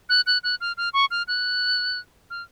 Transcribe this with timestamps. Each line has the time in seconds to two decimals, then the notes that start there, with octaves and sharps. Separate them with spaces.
0.09 F#6
0.26 F#6
0.43 F#6
0.61 F6
0.77 F6
0.94 C#6
1.11 F6
1.28 F#6
2.30 F6